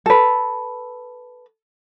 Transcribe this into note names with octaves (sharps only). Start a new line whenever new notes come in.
A4 B4